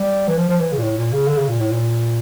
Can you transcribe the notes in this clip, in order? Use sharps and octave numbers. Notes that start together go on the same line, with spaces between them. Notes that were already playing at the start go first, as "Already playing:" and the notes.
Already playing: G3
E3
F3
F3
E3
C#3
A#2
A2
A#2
C#3
D3
C#3
A#2
A2
A#2